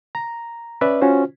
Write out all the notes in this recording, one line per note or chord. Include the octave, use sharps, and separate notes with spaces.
A#5
C#4 B4 D5 E5
C#4 F4 F#4 C5